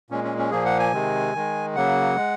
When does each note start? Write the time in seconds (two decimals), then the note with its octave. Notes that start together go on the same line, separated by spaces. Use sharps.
0.10 A#2 G#3 C#4
0.24 C#4
0.38 C#4
0.51 A#2 F3 A#3 G#4
0.65 F#5
0.79 G#5
0.92 C3 D#3 G#3
1.35 D#3 G#3
1.76 C#3 F#3 A#3 F#5
2.17 G#3